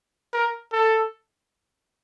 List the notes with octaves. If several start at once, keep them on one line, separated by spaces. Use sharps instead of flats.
A#4
A4